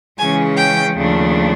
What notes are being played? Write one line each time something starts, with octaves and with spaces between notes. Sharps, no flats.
C#3 E3 G#3 C#4 G#5
G5
D#2 C#3 F3 A3 D4